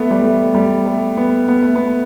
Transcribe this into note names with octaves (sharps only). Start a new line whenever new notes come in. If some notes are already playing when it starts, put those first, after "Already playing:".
Already playing: A3 B3
G3
A3
G3
A3
B3
B3
A3
B3